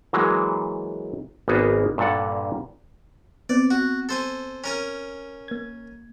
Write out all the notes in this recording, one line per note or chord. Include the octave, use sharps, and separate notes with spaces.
E3 F#3 G#3 A#3
G#1 A#3 B3 F#4 G#4 B4
G2 A#2 A4 F#5
B3 C4 D5
F#4
A4 C5 G#5
C#4 A#4 G#5
A#3 G#6